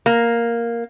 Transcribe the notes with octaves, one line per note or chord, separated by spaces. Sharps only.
A#3